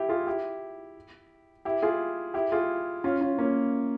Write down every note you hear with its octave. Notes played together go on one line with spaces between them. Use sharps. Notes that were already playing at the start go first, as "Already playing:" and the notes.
Already playing: E4 G4
F4 G#4
E4 G4
E4 G4
F4 G#4
E4 G4
F4 G#4
C#4 F4
C#4 F4
A#3 C#4